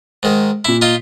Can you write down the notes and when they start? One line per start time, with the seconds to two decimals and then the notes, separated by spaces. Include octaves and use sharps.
0.23 G#2 D#3
0.65 A#2 E4 B6
0.81 D#4 F4 C6